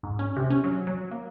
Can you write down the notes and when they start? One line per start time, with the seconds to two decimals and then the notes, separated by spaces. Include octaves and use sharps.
0.03 G#2
0.19 C#4
0.37 C3
0.50 C#4
0.64 F#3
0.87 F#3
1.11 A#3